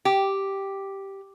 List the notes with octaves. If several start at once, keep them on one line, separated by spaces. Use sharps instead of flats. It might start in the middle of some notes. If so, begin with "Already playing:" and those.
G4